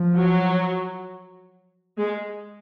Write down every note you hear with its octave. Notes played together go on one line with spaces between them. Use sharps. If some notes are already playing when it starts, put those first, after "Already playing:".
Already playing: F3
F#3
G#3